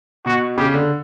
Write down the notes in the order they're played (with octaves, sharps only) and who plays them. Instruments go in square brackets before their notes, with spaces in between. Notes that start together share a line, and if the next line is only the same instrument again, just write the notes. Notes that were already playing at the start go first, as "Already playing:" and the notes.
[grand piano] B2 [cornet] F#4
[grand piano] C#3 [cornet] G4
[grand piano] D3